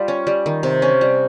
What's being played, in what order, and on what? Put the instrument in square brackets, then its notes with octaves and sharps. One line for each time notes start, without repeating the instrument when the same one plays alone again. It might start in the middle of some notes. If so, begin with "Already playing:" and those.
Already playing: [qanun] G3 F4 G4
C#4
G3
D#3
C3
C#4
G3